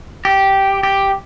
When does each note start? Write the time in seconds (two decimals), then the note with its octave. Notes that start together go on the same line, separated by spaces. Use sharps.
0.25 G4
0.83 G4